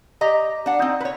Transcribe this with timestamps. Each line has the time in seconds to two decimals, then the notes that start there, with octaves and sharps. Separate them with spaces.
0.21 G4 D#5 A#5
0.66 D4 F#5
0.79 C4 D#4
1.01 B4 C#5